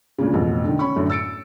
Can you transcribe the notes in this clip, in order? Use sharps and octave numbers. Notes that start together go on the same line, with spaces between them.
D2 A#2 C#3
A1 F2 B2
D3 D#3
C#4 B5 C#6
F#2 A2 D3 A3
E6 A6 C#7 D7